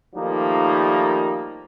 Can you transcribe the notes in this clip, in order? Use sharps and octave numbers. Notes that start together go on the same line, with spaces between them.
D#3 F3 G3 A3 A#3 D#4